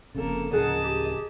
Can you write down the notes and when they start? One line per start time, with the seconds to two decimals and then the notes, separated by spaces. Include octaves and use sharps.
0.15 F1 F2 C#3 A#3 A4
0.53 D1 C#3 F3 G#4 A#4 D#5 F#5 A5
0.84 G4